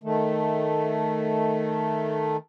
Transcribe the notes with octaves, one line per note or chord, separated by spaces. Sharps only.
D#3 A3